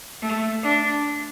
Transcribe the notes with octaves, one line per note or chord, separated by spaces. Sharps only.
A3
D4